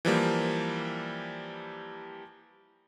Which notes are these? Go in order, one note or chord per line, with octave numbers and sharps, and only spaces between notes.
E3 F3 G3 A#3